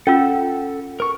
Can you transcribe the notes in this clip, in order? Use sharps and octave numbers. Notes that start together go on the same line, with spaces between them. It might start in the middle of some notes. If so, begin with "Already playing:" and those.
C#4 F4 A4 F#5 E6
A#4 C#6